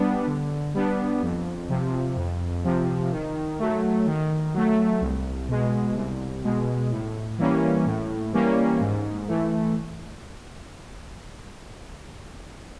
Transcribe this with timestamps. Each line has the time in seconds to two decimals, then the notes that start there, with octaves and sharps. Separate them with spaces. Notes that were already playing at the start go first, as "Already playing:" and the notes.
Already playing: G3 B3 D4
0.27 D3
0.74 G3 B3 D4
1.22 F2
1.69 C3 F3
2.16 F2
2.64 C3 F3
3.12 D#3
3.59 F#3 A3
4.06 D#3
4.54 F#3 A3
5.01 C2
5.48 B2 G#3
5.95 C2
6.43 B2 G#3
6.91 A2
7.38 E3 G3 A#3 C#4
7.85 A2
8.33 E3 G3 A#3 C#4
8.80 G#2
9.27 E3 A3